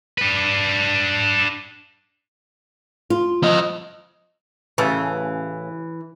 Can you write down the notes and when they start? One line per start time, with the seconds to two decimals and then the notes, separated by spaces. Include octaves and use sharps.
0.18 D4 B4
3.10 F4
3.43 F3 D#5
4.78 A1 C#3 E3 A4